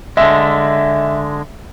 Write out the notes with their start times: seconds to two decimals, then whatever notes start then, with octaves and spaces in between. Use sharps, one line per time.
0.17 D3 G#3 E5